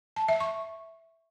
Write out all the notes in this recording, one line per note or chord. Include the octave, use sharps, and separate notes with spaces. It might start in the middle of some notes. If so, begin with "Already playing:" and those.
A5
E5
C#6